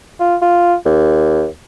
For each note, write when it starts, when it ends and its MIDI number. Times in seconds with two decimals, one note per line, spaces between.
0.20 0.36 65
0.42 0.75 65
0.85 1.46 39